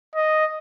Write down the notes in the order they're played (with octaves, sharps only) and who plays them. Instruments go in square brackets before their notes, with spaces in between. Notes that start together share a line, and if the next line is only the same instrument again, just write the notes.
[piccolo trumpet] D#5